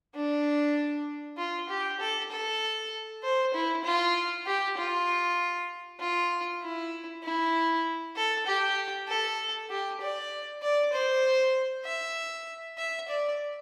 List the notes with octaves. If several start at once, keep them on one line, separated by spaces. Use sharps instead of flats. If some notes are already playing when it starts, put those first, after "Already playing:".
D4
F4
G4
A4
A4
C5
E4
F4
G4
F4
F4
E4
E4
A4
G4
A4
G4
D5
D5
C5
E5
E5
D5